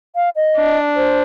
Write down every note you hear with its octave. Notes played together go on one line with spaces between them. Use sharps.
F5
D#5
D4
C5